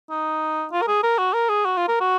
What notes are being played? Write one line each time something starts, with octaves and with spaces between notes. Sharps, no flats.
D#4
F4
A#4
G#4
A#4
F#4
A#4
G#4
F#4
F4
A#4
F#4